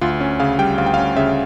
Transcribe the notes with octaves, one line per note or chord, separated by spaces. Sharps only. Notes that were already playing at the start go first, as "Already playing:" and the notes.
D2 F4
C#4
C#3 F5
G3 G5
D2 F5
G5
F5
C#4
C#3 E5